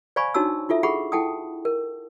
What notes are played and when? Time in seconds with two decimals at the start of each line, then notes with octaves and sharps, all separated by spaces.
0.16 C5 D5 F5 G#5 B5 C#6
0.34 D4 D#4 F#4 C#5 A5 E6
0.69 E4 F4 A4 E5
0.83 G#4 A4 F#5 B5 C#6
1.12 E4 A4 F#5 G5 A5 D#6
1.65 A#4